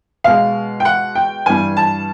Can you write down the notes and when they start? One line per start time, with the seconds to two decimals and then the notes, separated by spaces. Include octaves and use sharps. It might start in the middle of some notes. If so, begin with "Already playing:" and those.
0.24 B2 G#3 F5
0.80 G5
0.85 F#5
1.15 G5
1.46 G2 E3 G3 G#5
1.77 A5